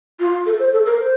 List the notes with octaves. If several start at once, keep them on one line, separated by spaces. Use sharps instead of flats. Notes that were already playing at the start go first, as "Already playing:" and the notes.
F4
A4
C5
A4
A#4
C5